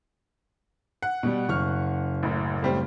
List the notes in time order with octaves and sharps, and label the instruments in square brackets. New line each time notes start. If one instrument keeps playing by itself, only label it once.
[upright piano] F#5
[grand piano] B2 G3
F#1 C#6 F6
[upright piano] A1 F#2
A2 G3 C4